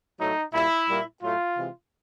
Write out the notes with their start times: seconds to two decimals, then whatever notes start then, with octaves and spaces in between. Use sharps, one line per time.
0.19 A2 F#3 A3 D#4
0.53 A#2 G3 A#3 E4
0.88 A#2 G3 A#3
1.22 A2 F#3 A3 F4
1.56 C3 E3 G#3